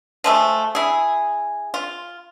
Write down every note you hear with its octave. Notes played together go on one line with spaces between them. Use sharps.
F3 G#3 A3
E4 G#4
F4